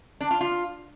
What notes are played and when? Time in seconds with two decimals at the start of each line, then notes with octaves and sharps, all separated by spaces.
0.21 D4
0.31 F4
0.41 F4